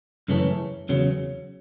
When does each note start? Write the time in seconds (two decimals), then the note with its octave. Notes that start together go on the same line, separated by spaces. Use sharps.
0.28 F#2 C#3 E3 A3 C#4
0.89 E2 C#3 F#3